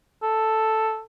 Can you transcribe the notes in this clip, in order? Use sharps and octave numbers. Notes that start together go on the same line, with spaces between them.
A4